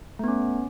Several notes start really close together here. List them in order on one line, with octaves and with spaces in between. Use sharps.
A3 B3 C#4